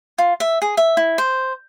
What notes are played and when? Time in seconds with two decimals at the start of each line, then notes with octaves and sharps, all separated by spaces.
0.18 F4
0.40 E5
0.62 G#4
0.77 E5
0.97 E4
1.18 C5